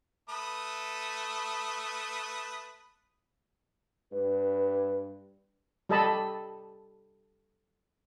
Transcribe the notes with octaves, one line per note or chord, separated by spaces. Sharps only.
A3 B4 D#6
G2 B4
G3 G4 A4 D#5 A5 B5